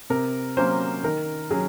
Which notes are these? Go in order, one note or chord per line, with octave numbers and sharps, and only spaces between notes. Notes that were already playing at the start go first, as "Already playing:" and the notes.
C3 A#4
F#3 A#3 C#4 C5
D#3 A#4
F#3 C#4 G#4